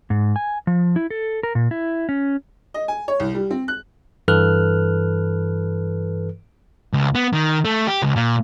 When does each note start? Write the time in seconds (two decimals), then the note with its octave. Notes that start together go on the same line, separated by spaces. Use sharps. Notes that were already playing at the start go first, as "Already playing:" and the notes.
0.10 G#2
0.36 G#5
0.67 F3
0.96 E4
1.10 A4
1.43 A#4
1.55 A#2
1.71 E4
2.09 C#4
2.74 D#5
2.88 G#5
3.08 C#5
3.20 C2
3.35 G3
3.51 C4
3.68 F#6
4.28 G2 E3 A4 B4 F6 F#6
6.93 C#2
7.15 B3
7.33 D#3
7.65 A3
7.87 G4
8.02 C#2
8.16 A#2